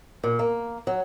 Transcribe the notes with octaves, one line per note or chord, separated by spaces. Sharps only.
A#2
A#3
F#3